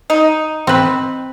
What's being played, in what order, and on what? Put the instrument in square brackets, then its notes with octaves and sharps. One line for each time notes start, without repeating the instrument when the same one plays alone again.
[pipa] D#4
[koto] C4 B4